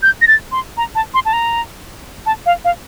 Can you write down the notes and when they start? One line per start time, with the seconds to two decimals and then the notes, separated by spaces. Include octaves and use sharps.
0.03 G6
0.21 A#6
0.28 A6
0.52 C6
0.77 A#5
0.95 A5
1.14 C6
1.25 A5
1.33 A#5
2.26 A5
2.46 F5
2.65 F5